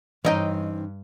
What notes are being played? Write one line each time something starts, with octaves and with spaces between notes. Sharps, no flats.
G2 E3 C4 C#4 D#4 D#5 G5